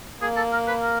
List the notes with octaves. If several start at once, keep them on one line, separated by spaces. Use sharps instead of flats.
A#3 G#4
A4
A#4
B4
A#4